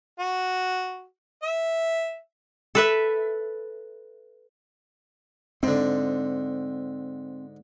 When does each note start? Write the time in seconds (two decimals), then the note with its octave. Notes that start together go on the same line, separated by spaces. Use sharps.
0.19 F#4
1.43 E5
2.75 A4 B4 E5
5.63 G#2 D3 C4